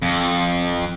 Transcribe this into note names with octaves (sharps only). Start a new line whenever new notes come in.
F2